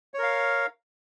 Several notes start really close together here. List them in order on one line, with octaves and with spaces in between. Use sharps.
C#5 A#4 F5